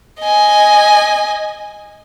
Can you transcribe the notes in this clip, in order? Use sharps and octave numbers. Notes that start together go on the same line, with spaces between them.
D#5 G#5